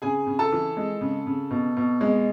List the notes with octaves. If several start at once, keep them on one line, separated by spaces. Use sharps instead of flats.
C#3 G#4 G#5
C#3
A4 A5
E3
G#3
C#3
C#3
B2
B2
G#3